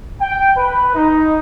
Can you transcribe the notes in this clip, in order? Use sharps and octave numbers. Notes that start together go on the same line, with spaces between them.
G5
B4
D#4